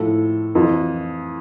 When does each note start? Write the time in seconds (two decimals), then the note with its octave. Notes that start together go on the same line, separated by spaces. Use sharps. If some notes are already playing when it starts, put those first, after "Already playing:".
Already playing: A2 F3 A4
0.55 F2 E3